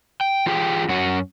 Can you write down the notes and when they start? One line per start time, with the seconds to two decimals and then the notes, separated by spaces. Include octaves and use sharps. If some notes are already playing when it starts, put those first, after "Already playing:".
0.21 G5
0.46 E3 F4 G4 G#4 G5
0.89 F#2 C#4 F#4